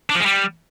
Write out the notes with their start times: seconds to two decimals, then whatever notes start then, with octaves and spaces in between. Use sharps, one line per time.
0.10 D4
0.15 F3
0.20 G#3
0.26 G3